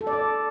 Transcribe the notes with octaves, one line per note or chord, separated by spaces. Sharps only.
A4
D5
A4